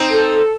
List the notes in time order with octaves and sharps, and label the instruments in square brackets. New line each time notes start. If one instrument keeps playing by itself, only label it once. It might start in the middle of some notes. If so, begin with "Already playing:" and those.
Already playing: [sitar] C4 D#4
[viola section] A4